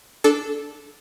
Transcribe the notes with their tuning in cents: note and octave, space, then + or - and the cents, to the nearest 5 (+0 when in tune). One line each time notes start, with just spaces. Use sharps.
D4 +0 A4 -10